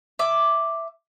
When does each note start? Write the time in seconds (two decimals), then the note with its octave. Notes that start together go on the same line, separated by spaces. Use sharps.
0.19 E5 D6